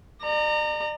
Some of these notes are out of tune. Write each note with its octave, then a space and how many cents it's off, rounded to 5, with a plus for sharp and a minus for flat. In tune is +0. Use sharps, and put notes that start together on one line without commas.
D5 +40 A#5 -25